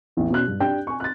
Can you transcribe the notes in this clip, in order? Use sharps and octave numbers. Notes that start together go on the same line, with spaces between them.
A1 E2
B2 C#4 F#6
G2
D4 G4 G5 G6
G#5 C#6
F#6 A6